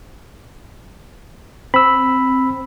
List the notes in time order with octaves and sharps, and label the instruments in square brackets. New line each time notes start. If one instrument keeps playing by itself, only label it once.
[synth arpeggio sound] C4 [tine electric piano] B5 E6